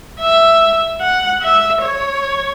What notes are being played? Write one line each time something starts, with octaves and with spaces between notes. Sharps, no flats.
E5
F#5
E5
C#5